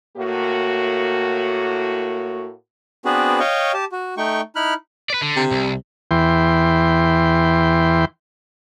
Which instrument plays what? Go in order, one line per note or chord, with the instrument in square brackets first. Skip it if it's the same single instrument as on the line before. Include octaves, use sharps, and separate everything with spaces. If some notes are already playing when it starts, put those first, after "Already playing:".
[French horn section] A2 A#3 F#4
[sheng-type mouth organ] B3 C4 D4 F#4 G#4 B4
C#5 D#5 F5 G5 C#6
G4 A5
F#4
A3 D#4 G5 C#6
D#4 E4 B5 F6 F#6
[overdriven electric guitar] B4 D5
D3
[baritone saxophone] C3
[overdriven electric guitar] C2
[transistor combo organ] E2 E3 G5 C6